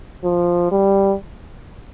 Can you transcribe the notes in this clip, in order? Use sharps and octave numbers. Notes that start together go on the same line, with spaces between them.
F3
G3